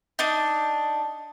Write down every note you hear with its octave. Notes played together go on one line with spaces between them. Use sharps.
D4 D#4